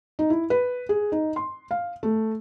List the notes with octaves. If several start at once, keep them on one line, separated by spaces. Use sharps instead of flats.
D#4
E4
B4
G#4
D#4
C6
F5
A3